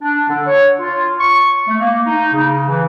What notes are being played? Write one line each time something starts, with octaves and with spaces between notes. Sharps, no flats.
D4
D3
C#5
F4
C#6
A3
A#3
D#4
C#3
E3